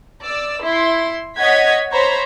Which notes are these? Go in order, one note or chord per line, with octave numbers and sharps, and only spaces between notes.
D5 E6
E4 C6
C#5 D#5 F#5 G#6 B6
C5 C#5 A#5 B5